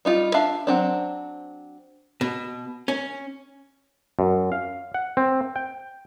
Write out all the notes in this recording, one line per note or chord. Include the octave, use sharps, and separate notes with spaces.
G3 D#4 F4
D4 E5 F5
F#3 C4 D4
B2
C#4
F#2
F5
F#5
C4
G5